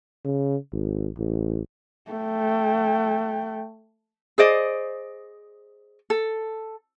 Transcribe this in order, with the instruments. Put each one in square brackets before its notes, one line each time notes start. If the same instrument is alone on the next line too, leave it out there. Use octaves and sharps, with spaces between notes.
[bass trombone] C#3
G#1
A1
[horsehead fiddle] A3 G5
[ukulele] G#4 C5 D5 D#5
A4